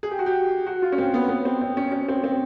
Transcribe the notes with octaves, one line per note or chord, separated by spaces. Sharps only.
G#4
G4
F#4
G4
F#4
F4
C#4
C4
B3
B3
C4
C4
C#4
C#4
C4
C4